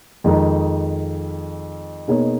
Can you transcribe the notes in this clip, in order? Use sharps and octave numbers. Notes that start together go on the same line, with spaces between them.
F2 D#3 G#3 D#4
B2 A#3 D#4 G#4 C#5